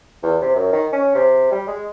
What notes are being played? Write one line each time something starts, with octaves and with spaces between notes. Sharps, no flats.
E2
C3
F#2
D#3
C#4
C3
G3
G#3